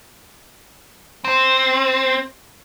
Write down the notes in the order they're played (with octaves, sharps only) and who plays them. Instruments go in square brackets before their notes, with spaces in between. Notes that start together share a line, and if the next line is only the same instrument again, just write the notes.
[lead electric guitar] C4